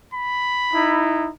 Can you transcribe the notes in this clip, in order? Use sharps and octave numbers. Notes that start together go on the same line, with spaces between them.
B5
D#4 E4